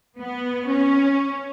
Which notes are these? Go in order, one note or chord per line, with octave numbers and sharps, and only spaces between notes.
B3
C#4